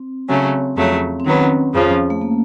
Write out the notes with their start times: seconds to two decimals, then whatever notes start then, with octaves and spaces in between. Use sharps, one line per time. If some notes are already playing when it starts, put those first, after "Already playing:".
Already playing: C4
0.28 C#3 F#3 A3 C4 C#4
0.76 F2 C#3 F#3 A3
1.20 C4
1.25 D#3 F#3 B3 C#4
1.74 F2 C#3 F3
2.10 A3
2.21 A#3